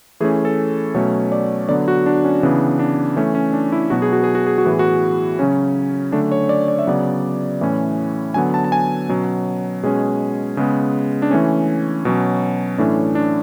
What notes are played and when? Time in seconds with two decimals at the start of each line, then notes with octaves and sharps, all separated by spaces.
0.20 E3 A3 C#4 G#4
0.45 A4
0.94 B2 F#3 A3 C#4 C#5
1.32 D5
1.69 D3 F#3 B3 D5
1.88 F#4
2.06 D4
2.24 C#4
2.43 C#3 E3 B3 D4
2.79 D4
3.16 E3 A3 C#4
3.35 C#4
3.53 D4
3.72 E4
3.90 B2 F#3 B3 F#4
4.02 G#4
4.12 F#4
4.24 G#4
4.35 F#4
4.47 G#4
4.58 F#4
4.65 A2 E3 B3 G#4
4.79 F#4
5.39 C#3 F#3 C#4
6.12 D3 F#3 A3 C#4 D4
6.32 C#5
6.49 D5
6.68 D5
6.79 E5
6.87 C#3 F#3 B3 D5
7.61 A2 E3 A3 C#4
8.34 D3 F#3 B3 G#5
8.54 A5
8.64 A5
8.72 G#5
9.09 B2 F#3 C#4
9.83 B2 G#3 C#4 G#4
10.57 C#3 G#3 B3
11.22 D4
11.31 E3 A3 C#4
12.05 B2 F#3 C#4
12.78 A2 E3 A3 C#4 D4
13.15 D4